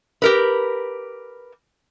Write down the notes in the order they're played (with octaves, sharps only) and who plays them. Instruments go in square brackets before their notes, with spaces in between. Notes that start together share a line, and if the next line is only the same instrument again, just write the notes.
[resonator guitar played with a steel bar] G4 A#4 B4